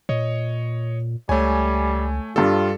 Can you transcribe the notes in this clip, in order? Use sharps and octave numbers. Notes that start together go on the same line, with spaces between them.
A#2 C#5 D#5
C#2 G3 A3 C#5 G#5
G2 G3 F4 A4